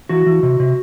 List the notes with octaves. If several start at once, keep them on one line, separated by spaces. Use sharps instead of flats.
E3 F#4
E3
C3
C3